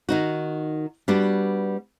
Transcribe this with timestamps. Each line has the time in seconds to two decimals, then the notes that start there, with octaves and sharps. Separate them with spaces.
0.09 D#3 D#4 F#4
1.08 G3 B3 D4 F#4